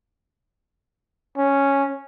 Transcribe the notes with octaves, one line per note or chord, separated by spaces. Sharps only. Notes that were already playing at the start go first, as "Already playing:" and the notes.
C#4